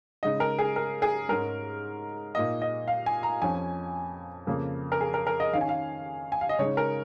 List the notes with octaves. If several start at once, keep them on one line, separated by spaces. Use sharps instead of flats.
C#3 G#3 D#4 D#5
A#4
G#4
A#4
G#4
G#2 G#3 C#4 A#4
A#2 A#3 D#4 D#5
D#5
F5
G#5
A#5
F2 F3 C#4 G#5
F2 C#3 A#3
A#4
G#4
A#4
A#4
D#5
D#3 C#4 F5 G#5
F5
G#5
F5
D#5
C#3 G#3 D#4 C#5
A#4